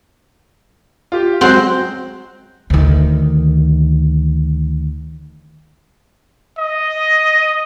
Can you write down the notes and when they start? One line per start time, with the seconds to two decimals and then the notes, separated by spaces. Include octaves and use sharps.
1.12 F4 G4
1.41 F#3 G#3 C4 F#4 C5 F#5
2.70 D2 D#3
6.58 D#5